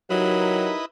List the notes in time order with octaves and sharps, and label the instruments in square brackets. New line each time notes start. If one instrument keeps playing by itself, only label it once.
[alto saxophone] F#3 [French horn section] D#4 G4 A#4 [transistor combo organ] E4 B4 D#5